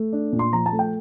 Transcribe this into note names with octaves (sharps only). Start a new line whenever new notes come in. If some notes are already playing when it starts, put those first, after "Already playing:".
Already playing: A3
D4
A#2
C6
F3 A#5
A5
A3
G5